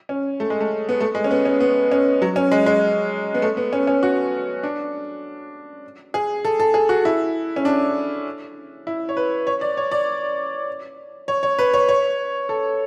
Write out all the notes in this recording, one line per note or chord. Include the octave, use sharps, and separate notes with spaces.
C#4
A3
G#3
A3
B3
A3
G#3
C#4
B3
C#4
B3
C#4
F#3
C#4
G#3
G#3
B3
A3
B3
C#4
C#4
F#4
D4
G#4
A4
A4
G#4
F#4
E4
C#4
D4
E4
C#5
B4
C#5
D5
C#5
D5
C#5
C#5
B4
C#5
C#5
A4